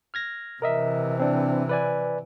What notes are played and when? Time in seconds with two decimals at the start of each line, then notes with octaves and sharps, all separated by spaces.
0.14 F6 G#6 A#6
0.62 C3 E3 A#4 D#5 E5
1.19 C4 D4
1.69 B4 D5 G#5